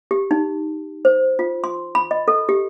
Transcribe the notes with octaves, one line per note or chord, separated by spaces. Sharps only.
G4
D#4
C5
F4
C6
B5
D#5
A4
G4